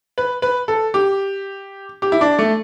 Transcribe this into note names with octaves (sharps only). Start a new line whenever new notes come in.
B4
B4
A4
G4
G4
E4
D4
A3